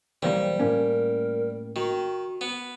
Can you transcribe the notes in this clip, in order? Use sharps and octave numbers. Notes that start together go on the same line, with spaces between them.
B1 E3 G3 A#3 C5
A2 A#3 C#4 A#4
D#3 F#4
B3